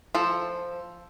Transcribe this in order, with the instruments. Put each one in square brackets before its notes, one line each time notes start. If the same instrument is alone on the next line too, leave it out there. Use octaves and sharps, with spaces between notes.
[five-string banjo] F3 A4